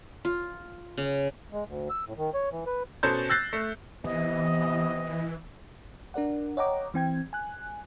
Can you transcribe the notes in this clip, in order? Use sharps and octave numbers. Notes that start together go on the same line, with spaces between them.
F4
C#3
G#3
D2
E6
A2
D#3
C#5
E3
B4
B2 C#4 A4 C5 A5 G6
E6 F#6 G6 A6 A#6 C7
A3
C3 E3 B3 D#5
D4 A#4 D5 F#5
C#5 D#5 F#5 G5 A#5 D6
E3 C4 G5 G#6
G#5 F#6